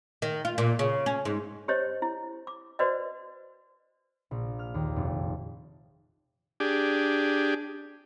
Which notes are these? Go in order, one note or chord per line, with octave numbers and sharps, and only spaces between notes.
D#3
F4
A#2
C#3
C#4
G#2
G4 C5 C#5 D#5
E4
D6
F#4 B4 C5 D5 D#5
A#1
F6
D#2
F1
D4 G4 G#4